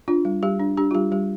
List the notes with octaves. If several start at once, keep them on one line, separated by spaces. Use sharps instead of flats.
D4 F4
G3
G3 G4
D4
D4 G4
F4
G3 G4
G3 G4